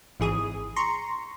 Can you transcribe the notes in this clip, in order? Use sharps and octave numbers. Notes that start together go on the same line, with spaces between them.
G#1 E3 G#4 D#6
A#5 C6 C#6